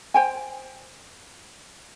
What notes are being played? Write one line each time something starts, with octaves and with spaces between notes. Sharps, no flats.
C5 G5 G#5